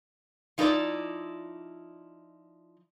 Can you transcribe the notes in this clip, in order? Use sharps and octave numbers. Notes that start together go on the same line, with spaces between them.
F3 D#4 E4 A#4 D5